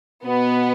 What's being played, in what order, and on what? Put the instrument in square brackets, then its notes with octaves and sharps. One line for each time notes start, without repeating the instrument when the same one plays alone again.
[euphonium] B2 [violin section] B3